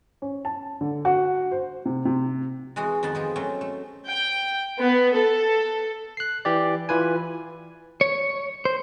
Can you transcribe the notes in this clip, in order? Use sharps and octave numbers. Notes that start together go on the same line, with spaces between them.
C#4
A5
D3
F#4
C5
C3
C3
E3 G#3 F#4 G#4
F2 D#3 B3 A5
F3 G#3 G4
F#3 A3 C4 C#4
A3
G5
B3
A4
F#6 C7
E3 G4 D5
E3 F4 B4 G#5
C#5
C5